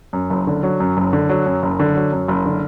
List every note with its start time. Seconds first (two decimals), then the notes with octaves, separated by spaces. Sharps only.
0.13 F#2
0.30 F#1
0.47 D3
0.63 F#3
0.80 F#2
0.97 F#1
1.13 D3
1.29 F#3
1.46 F#2
1.63 F#1
1.80 D3
1.96 F#3
2.12 F#2
2.28 F#1
2.45 D3